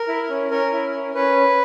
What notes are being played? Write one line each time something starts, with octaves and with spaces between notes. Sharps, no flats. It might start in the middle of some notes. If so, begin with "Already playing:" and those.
Already playing: A#4
E4
C#4
C#4 A#4
E4
C#4
C#4 B4